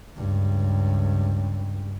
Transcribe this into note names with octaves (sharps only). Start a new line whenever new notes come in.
C#2 G2